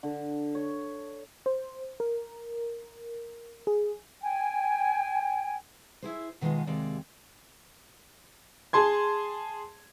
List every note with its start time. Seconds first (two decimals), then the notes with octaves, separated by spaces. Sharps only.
0.03 D3
0.55 C#5
1.46 C5
2.00 A#4
3.67 G#4
4.21 G5 G#5
6.02 E4 G#4 C5
6.41 B2 D#3 G#3 B3 F4 D#5
6.67 D#2 C3 G#3 D5
8.73 G#4 A5 C6 G#6